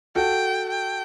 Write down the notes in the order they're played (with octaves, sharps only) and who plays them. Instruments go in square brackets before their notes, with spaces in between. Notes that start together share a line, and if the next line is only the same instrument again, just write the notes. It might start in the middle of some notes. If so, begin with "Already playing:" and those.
[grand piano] F#4 A4 [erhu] G5
[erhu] G5